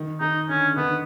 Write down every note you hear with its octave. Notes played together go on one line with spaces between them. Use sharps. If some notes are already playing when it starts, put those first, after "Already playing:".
Already playing: D#3
D#3 D#4
D3 C#4
D3
D#3 B3